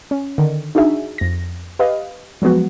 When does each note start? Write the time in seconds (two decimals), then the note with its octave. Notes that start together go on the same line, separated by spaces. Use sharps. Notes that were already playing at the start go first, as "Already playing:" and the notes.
0.11 C#4
0.38 D3 D#3
0.75 D4 D#4 F#4 G#4 E5
1.18 F2 A#6
1.79 G4 B4 D#5 F5
2.42 F3 F#3 G#3 B3 F#4